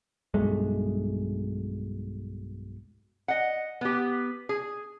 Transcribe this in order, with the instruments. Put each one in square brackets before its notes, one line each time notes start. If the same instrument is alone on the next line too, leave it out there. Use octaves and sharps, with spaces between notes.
[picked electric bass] B1 G2 G#3 A3
[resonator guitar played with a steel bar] D#5 F#5
B3 G4
G#4